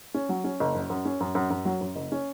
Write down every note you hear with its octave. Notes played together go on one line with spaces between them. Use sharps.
C#4
F#3
C#4
F#1
F#2
F#2
C#4
F#2
F#2
F#2
F#3
F#2
F#1
C#4